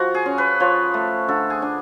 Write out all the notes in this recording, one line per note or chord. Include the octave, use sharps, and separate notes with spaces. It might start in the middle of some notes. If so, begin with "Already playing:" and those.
Already playing: F3 F#4
G#4
C#4
B4
F3 C#5
A3
D3 A4
G#4
D4